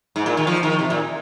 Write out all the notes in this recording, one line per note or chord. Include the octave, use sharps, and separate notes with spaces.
G#2
A#2
D#3
F3
D#3
C3
A#2